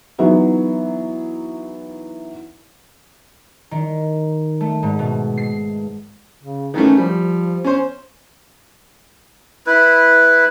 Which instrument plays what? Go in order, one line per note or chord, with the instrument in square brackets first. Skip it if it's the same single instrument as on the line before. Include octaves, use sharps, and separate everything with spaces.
[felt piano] E3 F#3 B3 D#4 E4
[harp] D#3
A3
G#2
B2
C7
[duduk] C#3
[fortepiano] D#3 E3 A3 [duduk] C#4
[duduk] F3 [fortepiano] G3
[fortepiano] C#4 C5
[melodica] E4 B4